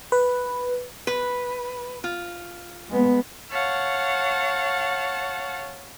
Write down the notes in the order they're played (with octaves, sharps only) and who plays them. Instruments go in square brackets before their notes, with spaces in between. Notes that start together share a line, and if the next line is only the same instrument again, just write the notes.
[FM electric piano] B4
[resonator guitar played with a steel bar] B4
F4
[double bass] G#3 B3
[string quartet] C#5 F5 F#5 A5